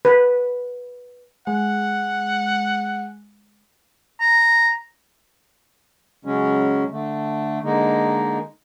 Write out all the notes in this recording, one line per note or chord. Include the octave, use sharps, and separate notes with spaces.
B4
G#3 F#5
A#5
C#3 F#3 G#3 C#4
D3 A3
D3 G#3 A#3 D#4